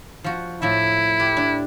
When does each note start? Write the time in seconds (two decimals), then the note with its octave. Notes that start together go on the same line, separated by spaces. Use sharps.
0.24 F3 F#4
0.62 A2 F3 E4 E5
1.20 G4 B4
1.37 D4